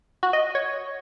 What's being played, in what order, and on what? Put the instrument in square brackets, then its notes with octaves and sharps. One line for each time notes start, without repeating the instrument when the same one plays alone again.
[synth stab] F#4
D#5
C#5